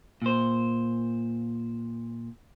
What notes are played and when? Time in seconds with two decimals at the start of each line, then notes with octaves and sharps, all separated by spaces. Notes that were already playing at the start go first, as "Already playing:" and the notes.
0.22 A#2 C5